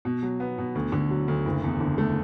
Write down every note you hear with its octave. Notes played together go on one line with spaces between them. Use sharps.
B2
F#3
B3
B2
D2
D3
F#3
D2
F#1
E2
D3
A3